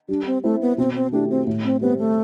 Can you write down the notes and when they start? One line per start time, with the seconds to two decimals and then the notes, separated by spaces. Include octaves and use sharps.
0.08 G3 D4
0.26 C4
0.44 A3 C4 E4
0.61 B3
0.78 B2 C4
0.95 C4
1.12 A3 D4 E4 G4
1.30 C4
1.47 A2
1.64 C4
1.81 G3 B3 C4
1.98 A3